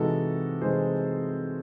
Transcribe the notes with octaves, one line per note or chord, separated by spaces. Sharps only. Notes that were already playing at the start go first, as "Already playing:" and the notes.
Already playing: C3 E3 G#3 D#4 F#4 A4
C3 E3 G#3 D#4 G#4 C5